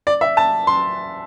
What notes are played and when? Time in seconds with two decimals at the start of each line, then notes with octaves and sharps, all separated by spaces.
0.07 D5
0.21 E5
0.37 A5
0.67 C6